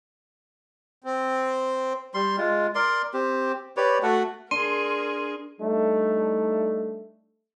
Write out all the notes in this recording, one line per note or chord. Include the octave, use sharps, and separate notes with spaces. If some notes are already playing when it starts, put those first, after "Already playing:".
C4
G3 C6
G#3 F4
A#4 D5 C6
C4 G4
G4 B4 C#5 D5
A3 F#4 A4 F#5
D4 G#4 A#4 C6 D#7
G3 A3 D4 D#4